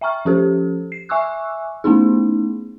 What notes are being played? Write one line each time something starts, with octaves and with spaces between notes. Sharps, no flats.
E5 G5 A#5 C#6 F6
F3 C#4 G4 A4 C5
C7
E5 G#5 C#6 D6 E6 F#6
A3 B3 C#4 D#4 E4 G#4